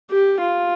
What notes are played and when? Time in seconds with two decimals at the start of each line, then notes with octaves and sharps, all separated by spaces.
0.10 G4
0.40 F4